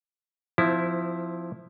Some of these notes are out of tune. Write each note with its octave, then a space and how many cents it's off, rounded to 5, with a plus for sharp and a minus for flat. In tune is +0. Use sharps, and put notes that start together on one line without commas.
F3 +0 C4 -25 E4 +0